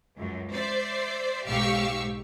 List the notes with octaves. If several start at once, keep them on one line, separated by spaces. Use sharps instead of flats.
C#2 F#2
C5 D5 E5
B1 G#2 G4 F5 C#6 E6